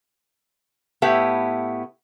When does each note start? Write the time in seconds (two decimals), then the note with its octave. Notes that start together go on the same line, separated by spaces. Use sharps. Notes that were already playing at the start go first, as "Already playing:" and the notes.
1.02 A2 B3 E4 G4 E5